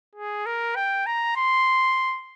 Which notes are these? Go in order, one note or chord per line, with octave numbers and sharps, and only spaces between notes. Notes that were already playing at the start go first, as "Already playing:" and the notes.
G#4
A#4
G5
A#5
C6